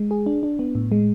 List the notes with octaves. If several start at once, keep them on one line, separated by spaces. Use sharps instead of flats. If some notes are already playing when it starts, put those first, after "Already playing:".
Already playing: G#3
G#4
D4
D4
B3
A2
G#3